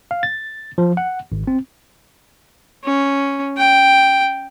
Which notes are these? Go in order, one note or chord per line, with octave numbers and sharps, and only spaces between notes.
F5
A6
F3
F#5
G#1
C4
C#4
G5